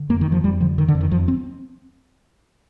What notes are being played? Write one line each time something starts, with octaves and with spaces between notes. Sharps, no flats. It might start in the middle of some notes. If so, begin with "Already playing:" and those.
Already playing: D3
F2 A#3
D#3
F2 F3
F2 G3
D3 F3
D3 D#3
D3
F2
D#3
F2 F3
C4